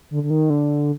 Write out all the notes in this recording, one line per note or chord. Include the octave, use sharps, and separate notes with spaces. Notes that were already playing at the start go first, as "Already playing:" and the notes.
D3
D3
D#3
D3